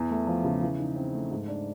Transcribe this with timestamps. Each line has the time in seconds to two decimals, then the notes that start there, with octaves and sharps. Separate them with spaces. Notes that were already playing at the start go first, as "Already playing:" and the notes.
Already playing: E2
0.10 A3
0.27 F3
0.44 C#3
0.62 E3
0.79 D#4
0.96 C4
1.13 A3
1.31 G#2
1.48 D4